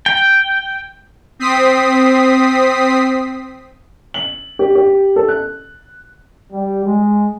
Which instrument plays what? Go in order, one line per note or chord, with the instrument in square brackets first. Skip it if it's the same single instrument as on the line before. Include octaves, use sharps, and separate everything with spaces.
[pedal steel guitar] G5
[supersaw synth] C4 D#6 B6 C7
[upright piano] F#7
G4
G4
A4
F#6
[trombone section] G3
G#3